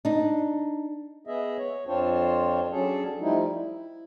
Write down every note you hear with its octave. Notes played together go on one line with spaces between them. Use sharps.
D4 D#4
B3 G#4 D#5 E5
C#5
F2 C4 D4 F4 C5 C#5
F#3 C#4 D4 G#4 A4
F3 G3 A3 D#4 E4
E4